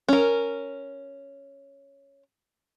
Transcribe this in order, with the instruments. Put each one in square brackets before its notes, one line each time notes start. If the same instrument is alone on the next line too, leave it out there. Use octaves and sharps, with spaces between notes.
[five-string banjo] C#4 A#4